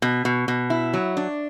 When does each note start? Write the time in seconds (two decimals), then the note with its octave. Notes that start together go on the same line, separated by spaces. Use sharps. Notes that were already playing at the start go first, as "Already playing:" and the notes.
0.02 B2
0.25 B2
0.48 B2
0.70 E4
0.94 F#3
1.17 D4